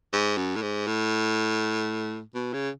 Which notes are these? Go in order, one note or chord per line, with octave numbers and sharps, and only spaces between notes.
G#2
F#2
A2
G#2
A2
B2
C#3